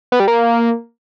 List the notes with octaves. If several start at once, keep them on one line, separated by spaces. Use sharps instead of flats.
B3
G3
A#3